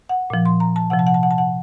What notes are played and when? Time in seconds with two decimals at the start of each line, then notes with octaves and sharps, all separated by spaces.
0.09 F#5
0.30 A#2 F3
0.45 C6
0.60 A#5
0.76 A5
0.90 C3 F3 F#5
0.99 A5
1.07 F#5
1.14 A5
1.23 F#5
1.31 A5
1.38 F#5